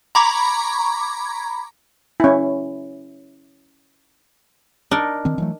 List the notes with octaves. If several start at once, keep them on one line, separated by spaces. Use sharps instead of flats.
A#5 B5 C#6 D6 G#6
C#4 E4
D4 D#4 A#4
D#3 C4
E3 F#3 A3